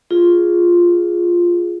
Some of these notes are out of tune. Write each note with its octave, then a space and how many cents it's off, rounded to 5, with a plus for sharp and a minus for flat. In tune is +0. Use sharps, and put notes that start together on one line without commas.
F4 +0 G#4 +0